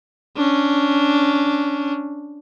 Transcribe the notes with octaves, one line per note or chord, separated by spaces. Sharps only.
C#4 D4